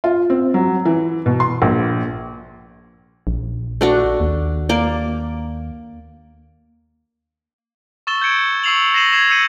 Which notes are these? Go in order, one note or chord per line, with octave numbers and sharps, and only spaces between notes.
F4
C4
F#3
E3
B2
C6
A#1
A#1
A3 D4 F#4
D#2
A#3 D5
C#6 E6 A6 E7 G7
G6 G#6 C#7 D7
C#6 E6 C7 F7 F#7
A#6 C7 D#7 E7 F#7
G#6 C7 E7
E6 G6 C#7 D#7 F7 F#7